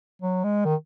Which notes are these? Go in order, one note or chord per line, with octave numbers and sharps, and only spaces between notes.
F#3
G#3
D#3